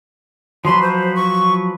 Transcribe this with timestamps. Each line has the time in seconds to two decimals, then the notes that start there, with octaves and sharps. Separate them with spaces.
0.65 F3 F#3 B4 C6
0.82 C5
1.16 C#6